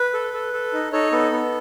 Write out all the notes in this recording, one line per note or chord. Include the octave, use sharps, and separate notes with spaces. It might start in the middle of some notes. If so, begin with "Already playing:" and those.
Already playing: B4
A4
A4
A4
D#4
D#4 A4 C#5
B3 A4
B3